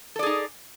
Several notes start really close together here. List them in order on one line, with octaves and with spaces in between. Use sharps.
A4 D5 G#4 D#4